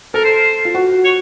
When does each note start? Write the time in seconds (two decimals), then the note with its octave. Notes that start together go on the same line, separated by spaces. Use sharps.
0.14 A4 A#4
0.24 C5
0.35 C5
0.65 F4
0.75 F#4
1.04 C#5